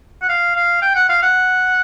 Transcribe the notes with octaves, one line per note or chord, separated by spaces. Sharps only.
F#5
F5
F5
G5
F#5
F5
F#5